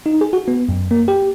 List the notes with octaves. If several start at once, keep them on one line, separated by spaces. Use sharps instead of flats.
D#4
G#4
F#4
B3
F#2
A#3
G4